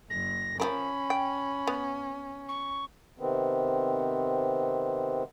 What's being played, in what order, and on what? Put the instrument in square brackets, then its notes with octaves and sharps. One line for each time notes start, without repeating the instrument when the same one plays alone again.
[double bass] F#1 [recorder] A#6
[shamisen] F3 A4 A#4 [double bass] C#4 [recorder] B5
[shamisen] G5
B3
[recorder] C#6
[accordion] C3 D#3 B3 C4